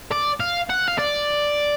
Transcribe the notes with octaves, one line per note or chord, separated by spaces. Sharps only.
D5
F5
F#5
F5
D5